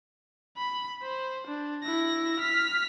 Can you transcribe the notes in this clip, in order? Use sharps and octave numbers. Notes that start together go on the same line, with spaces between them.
B5
C5
D4
E4 A#6
F6 B6